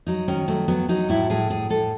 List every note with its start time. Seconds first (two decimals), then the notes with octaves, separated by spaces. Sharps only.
0.06 F#3 D#4
0.28 D#3 C#4
0.48 F#3 A3
0.68 F#3 B3
0.89 F#3 D#4
1.09 A2 E4
1.30 A2 G#4
1.50 A2 G#4
1.70 A2 A4